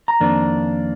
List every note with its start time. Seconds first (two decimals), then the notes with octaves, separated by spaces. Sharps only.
0.08 A#5
0.20 F2 D#3 A#3 D4